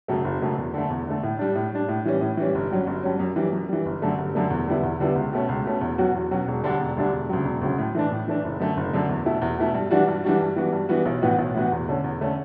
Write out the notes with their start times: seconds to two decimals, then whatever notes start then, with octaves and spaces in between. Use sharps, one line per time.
0.08 F#2 C#3 F#3 A3
0.24 F#1
0.42 F#2 C#3 F#3 A3
0.58 E2
0.74 D3 A3
0.90 E2
1.07 D3 A3
1.23 A2
1.39 G3 D4
1.55 A2
1.72 G3 D4
1.88 A2
2.05 E3 G3 C#4
2.21 A2
2.37 E3 G3 C#4
2.55 G1
2.71 G2 F#3 C#4
2.87 G1
3.03 G2 F#3 C#4
3.19 F#2
3.36 E3 G3
3.53 F#2
3.69 E3 G3
3.86 G1
4.02 F#2 D3 A3
4.18 G1
4.35 F#2 D3 A3
4.50 E2
4.68 D3 G3 B3 E4
4.83 E2
5.00 D3 G3 B3 E4
5.16 C#2
5.33 B2 A3 C#4
5.49 C#2
5.65 B2 A3 C#4
5.81 E2
5.98 B2 F#3 C#4 F#4
6.15 E2
6.31 B2 F#3 C#4 F#4
6.48 E1
6.63 D2 D3 G3 D4
6.80 E1
6.97 D2 D3 G3 D4
7.13 E1
7.29 D2 C#3 F#3
7.45 E1
7.61 D2 C#3 F#3
7.78 A2
7.95 E3 A3 D4
8.11 A2
8.28 E3 A3 D4
8.44 F#1
8.60 F#2 D3 A3
8.77 F#1
8.94 F#2 D3 A3
9.09 E2
9.26 B2 A3 E4
9.42 E2
9.58 B2 A3 E4
9.74 G2
9.91 E3 G3 D4 F#4
10.08 G2
10.24 E3 G3 D4 F#4
10.40 G2
10.56 E3 G3 B3 F#4
10.73 G2
10.89 E3 G3 B3 F#4
11.06 B1
11.22 A2 E3 B3 F#4
11.39 B1
11.54 A2 E3 B3 F#4
11.72 E2
11.88 D3 A3 C#4
12.04 E2
12.21 D3 A3 C#4